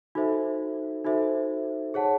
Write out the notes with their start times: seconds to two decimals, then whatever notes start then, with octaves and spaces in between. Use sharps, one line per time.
0.15 D#4 F#4 A4 C5 E5
1.04 D#4 F#4 A4 C5 E5
1.94 G#4 C#5 F#5 A5